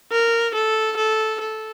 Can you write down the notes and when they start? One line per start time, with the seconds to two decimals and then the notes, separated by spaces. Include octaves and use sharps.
0.11 A#4
0.54 A4
0.97 A4
1.40 A4